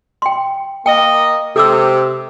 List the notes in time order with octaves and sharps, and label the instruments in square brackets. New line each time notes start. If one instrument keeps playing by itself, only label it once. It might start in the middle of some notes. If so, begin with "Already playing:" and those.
[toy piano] G5 C6
[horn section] A#3 D#5 [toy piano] G5
[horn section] C3 [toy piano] A4 D6 E6